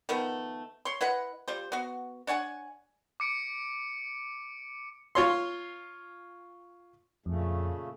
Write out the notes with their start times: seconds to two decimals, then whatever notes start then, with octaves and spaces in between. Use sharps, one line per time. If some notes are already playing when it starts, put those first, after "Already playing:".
0.09 D#3 F3 A3 B3
0.85 C#5 C6
1.01 E4 B4 D#5 F#5
1.48 G3 F4 C5
1.72 B3 F#4
2.27 D4 C#5 F#5 G#5
3.20 D6 C#7 D7
5.15 F4 C#5 C6
7.26 F2 A#2 C#3 A3